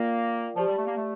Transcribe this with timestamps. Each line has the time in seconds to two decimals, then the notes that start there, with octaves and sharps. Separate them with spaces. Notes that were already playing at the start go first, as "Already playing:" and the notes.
Already playing: A#3 F4 A#4 D5 G5
0.56 F3 G4 D5 A5
0.66 G3
0.76 A3
0.86 A#3
0.96 A3